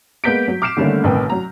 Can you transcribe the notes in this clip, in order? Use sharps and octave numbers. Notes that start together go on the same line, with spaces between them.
G#3 A#3 B3 G6 B6 D7
F#3
D6 F6 C7 D7 E7
D3 D#3 G3 A3 A#3 C#4
A1 C3 D#3 A#4 B4 G5
F#3 A#5